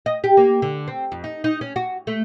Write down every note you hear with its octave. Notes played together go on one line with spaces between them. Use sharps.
D#5
G4
A#3
D3
C4
F2
D#4
D#4
C#4
F#4
A3